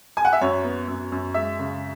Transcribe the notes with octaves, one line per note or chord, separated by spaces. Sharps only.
G#5
F#5
E5
F#2 C#5
B3
F#2
F#2
G#3 E5
C#3